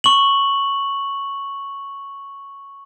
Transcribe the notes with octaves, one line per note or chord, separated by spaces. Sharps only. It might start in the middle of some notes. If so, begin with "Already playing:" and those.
C#6 F#7